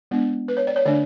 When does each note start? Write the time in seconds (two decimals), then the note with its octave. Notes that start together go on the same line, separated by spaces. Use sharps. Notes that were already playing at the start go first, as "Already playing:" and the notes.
0.11 G#3 B3 D4
0.48 B4
0.57 C#5
0.67 D5
0.76 C#5
0.86 D3 A3 D4 D5